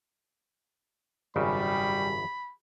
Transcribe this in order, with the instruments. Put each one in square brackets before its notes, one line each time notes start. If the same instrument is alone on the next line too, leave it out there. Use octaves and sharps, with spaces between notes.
[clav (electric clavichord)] G#1 F#2 C#3 [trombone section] G3 [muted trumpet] B5